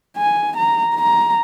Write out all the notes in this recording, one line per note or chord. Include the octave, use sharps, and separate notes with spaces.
G#5
A#5
A#5